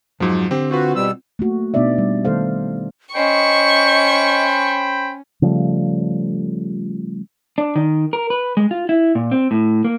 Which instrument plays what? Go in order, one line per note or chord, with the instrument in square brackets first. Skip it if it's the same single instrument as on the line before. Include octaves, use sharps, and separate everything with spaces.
[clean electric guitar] F2 F#3 [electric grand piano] G#2 F3
[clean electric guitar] D3 [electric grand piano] C4 G4 C5
[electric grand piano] C4 F4 B4 [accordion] F#4
[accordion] B2 G3 E6
[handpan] A3 A#3 F#4
B2 B3 D4 D#4 D5 E5
G3
D#3 A3 A4 C5 F5
[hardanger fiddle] C#4 [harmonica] C5 G5 B5 [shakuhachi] D#5 [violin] C#6
[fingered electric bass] C#3 F3 G3 A3
[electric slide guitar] D4
D#3
A#4
B4
G#3
F4
E4
A#2
C4
A2
A#3